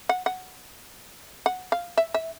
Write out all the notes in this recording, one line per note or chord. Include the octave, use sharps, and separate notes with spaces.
F#5
F#5
F#5
F5
E5
E5